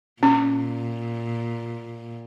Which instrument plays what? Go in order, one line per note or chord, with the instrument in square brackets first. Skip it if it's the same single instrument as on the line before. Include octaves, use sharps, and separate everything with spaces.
[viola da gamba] A#2 [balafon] C#4